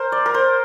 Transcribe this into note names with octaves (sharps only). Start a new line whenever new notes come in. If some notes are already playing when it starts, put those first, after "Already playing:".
Already playing: A#4 C5
D5
A#4
C5